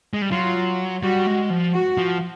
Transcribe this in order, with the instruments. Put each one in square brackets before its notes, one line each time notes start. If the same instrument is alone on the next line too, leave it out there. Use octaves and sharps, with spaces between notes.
[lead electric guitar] G#3
G3
[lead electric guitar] F#3 [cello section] F4
[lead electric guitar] G3 [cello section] F#4
[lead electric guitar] G#3
F3
[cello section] F#4
[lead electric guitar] F3